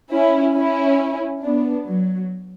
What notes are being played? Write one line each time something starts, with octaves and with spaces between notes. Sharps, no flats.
C#4 E4
C#4 E4
B3 D4
F#3